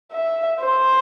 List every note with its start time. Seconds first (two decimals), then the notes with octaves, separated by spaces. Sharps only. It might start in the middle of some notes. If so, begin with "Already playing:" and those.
0.12 E5
0.60 C5